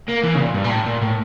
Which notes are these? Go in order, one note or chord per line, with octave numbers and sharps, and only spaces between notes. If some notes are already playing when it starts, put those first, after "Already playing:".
A#3
E3
C#3
A#2
G2
A#2
A2
A#2
A2